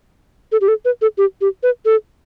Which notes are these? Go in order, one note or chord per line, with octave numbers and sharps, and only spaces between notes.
A4
G4
A4
B4
A4
G4
G4
B4
A4